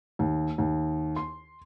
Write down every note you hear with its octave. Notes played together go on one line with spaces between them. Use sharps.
D#2
D#2
C6